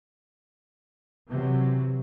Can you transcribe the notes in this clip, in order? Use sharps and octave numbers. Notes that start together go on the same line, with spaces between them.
C3 E3 F#3